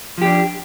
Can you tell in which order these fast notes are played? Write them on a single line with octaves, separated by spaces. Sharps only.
F3 G4 D4